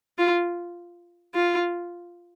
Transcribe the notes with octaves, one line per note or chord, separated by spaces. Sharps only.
F4
F4